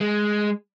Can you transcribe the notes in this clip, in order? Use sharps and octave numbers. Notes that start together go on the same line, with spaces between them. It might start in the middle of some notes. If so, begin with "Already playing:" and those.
G#3